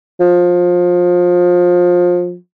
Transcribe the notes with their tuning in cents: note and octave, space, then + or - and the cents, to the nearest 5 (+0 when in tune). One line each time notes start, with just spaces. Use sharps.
F3 +25